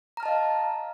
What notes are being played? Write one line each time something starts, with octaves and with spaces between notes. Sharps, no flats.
D#5 F5 A5 A#5 F6